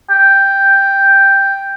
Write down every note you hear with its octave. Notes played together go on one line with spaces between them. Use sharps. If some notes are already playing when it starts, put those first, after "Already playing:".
G5